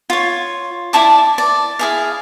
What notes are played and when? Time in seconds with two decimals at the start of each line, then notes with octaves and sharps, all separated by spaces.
0.10 F4 C#5
0.93 E4 D5 A5 D6
1.38 D5
1.79 E4 G#4 F5